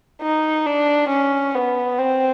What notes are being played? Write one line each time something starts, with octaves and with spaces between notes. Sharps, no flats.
D#4
D4
C#4
B3
C4